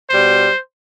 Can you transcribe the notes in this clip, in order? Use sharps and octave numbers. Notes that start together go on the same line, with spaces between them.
B2 G3 C5